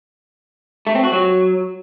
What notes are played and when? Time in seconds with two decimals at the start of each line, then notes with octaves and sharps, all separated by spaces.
0.87 A3
0.95 C4
1.04 F#4
1.12 F#3